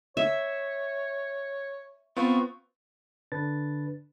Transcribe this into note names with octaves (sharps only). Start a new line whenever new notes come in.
C#5 E5
B3 C4 F4 C#6
D3 D4 B4 A6